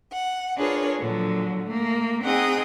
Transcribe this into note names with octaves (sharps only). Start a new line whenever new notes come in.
F#5
D4 F4 G#4 A#4 B4 C#5
A#2 D3 F3 F#3
A3 A#3
C4 D#4 G#4 F#5 G5 D#6